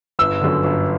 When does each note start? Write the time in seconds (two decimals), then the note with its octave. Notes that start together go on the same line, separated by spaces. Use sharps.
0.19 G1 E6
0.41 F#2 D3
0.64 G1